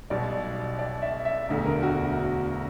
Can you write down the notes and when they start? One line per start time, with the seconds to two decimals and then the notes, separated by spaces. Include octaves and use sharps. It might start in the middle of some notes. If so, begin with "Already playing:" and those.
0.10 B1 B2 G3 D5
0.79 D5
1.02 E5
1.25 E5
1.48 E1 D2 D3
1.66 A#4
1.83 F#4